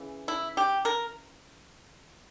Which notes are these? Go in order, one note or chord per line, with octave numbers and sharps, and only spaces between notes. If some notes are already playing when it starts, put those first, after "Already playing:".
Already playing: C#3 E3
E4
G4
A#4